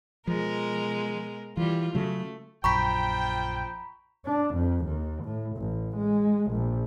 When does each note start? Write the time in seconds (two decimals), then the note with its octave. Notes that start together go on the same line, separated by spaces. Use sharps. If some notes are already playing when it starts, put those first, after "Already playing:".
0.27 B2 F3 G#3 A#4
1.57 E3 G3 F4
1.95 C#3 F#3 A3
2.64 A#1 F#2 F3 G5 A#5 B5 C#6 B6
4.25 D4
4.55 F2
4.85 D#2
5.24 A2
5.57 A1
5.96 G#3
6.51 A#1